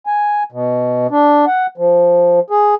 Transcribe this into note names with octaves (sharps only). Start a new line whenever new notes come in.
G#5
B2
D4
F#5
F3
G#4